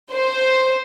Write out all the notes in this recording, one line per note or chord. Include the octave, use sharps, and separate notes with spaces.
C5